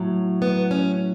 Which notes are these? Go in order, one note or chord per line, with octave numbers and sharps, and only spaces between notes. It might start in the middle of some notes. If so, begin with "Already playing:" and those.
Already playing: A2 F#3
B3
C#4